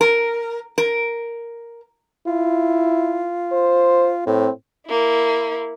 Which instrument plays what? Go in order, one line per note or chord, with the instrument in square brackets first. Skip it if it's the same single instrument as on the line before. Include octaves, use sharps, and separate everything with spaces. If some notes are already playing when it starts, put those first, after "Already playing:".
[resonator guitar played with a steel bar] A#4
A#4
[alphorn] E4 [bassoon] F4
[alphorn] C5
[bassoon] A2 [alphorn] C4
[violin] A#3 E4